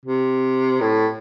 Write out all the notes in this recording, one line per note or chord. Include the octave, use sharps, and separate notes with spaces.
C3
A2